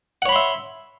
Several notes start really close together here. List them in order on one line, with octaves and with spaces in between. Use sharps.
F#5 C#5 B5 C6 E5